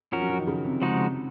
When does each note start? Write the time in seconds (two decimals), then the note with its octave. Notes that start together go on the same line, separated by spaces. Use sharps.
0.12 F3 C#4 F#4 A#4
0.21 F#3
0.30 F3
0.38 D#3
0.47 C#3
0.65 C3
0.82 C#3 F3 G#3 D#4 F#4